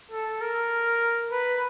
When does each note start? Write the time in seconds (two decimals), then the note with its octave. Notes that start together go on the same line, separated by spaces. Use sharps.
0.12 A4
0.41 A#4
1.32 B4